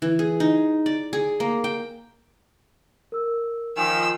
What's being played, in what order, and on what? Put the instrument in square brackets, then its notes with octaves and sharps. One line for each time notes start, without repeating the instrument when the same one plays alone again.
[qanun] E3
G#4
D#4
D5
G#4
A#3
G5
[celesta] A#4 E6
[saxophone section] D#3 F3 [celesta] G#5 F7 [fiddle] E6